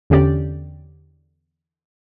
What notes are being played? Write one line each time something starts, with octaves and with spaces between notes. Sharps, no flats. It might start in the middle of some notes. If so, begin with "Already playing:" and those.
E2 D3 C#4 G4 D5